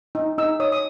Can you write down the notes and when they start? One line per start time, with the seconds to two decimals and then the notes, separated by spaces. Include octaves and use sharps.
0.15 D#4
0.38 D#4 E6
0.60 C#5 D#6
0.72 D#6